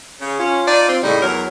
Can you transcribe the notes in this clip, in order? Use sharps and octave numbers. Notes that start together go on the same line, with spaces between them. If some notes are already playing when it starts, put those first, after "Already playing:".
C#3
C#4 F4
D#4 D5
C4
A2 C#3 G3 D#4
E2 F#3 A#4